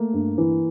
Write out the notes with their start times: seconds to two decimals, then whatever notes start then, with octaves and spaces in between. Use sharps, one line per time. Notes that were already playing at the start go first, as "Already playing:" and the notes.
Already playing: A3 A#3
0.13 G2
0.38 E3